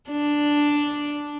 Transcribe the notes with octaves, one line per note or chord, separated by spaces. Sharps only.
D4